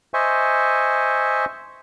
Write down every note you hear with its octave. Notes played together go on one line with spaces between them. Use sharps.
C5 D#5 E5 G#5 C#6